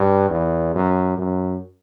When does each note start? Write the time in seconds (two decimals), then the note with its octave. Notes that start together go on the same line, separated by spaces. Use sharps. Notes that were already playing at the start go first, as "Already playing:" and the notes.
Already playing: G2
0.30 E2
0.74 F#2
1.18 F#2